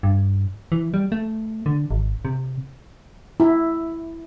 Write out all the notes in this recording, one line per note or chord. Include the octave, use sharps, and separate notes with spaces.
G2
E3
G3
A3
D3
G#1
C3
E4